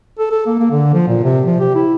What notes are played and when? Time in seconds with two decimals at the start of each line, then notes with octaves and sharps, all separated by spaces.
0.19 A4
0.32 A4
0.47 A#3
0.59 A#3
0.72 D3
0.94 F3
1.08 A#2
1.24 C3
1.46 F3
1.60 G4
1.76 E4